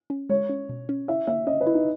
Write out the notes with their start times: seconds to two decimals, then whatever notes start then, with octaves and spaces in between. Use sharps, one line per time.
0.10 C#4
0.29 G#3 C#5
0.49 C#4
0.69 B2
0.89 C#4
1.08 E4 E5
1.27 A#3 E5
1.47 C#4 D#5
1.61 B4
1.67 E4
1.74 D#4